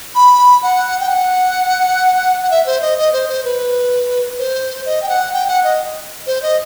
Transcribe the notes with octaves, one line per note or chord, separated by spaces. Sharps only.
B5
F#5
G5
F#5
F#5
E5
C5
D#5
D#5
C5
C5
B4
C5
D#5
G5
F#5
G5
F#5
D#5
C5
D#5